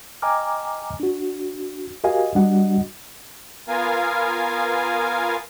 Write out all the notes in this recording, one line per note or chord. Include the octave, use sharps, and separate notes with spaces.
D#5 G5 G#5 A#5 D6 F6
D4 F#4
F#4 G4 A#4 D#5 F5 G#5
G3 D4 F#4 D#5 F#5
B3 F4 A#4 F5 G#5